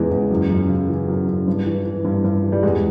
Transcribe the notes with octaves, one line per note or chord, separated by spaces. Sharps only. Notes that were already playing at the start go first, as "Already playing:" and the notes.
Already playing: E2 C#3 E3 G#3
E2
F#2
F#2
C#3
E3
F#2
F#2
G2
E3
E3
G2
G2
E3
G3
E2 G#3